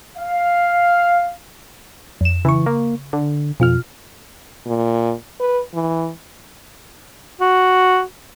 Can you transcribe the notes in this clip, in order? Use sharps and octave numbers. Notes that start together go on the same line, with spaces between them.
F5
F2 E7
C#3 E3 C#6
A#3
D3
F2 B2 F4 F6
A#2
B4
E3
F#4